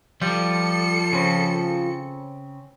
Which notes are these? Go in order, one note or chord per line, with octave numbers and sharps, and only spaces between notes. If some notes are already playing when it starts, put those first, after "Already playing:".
F3 G3 A4 C#7
C#3 C4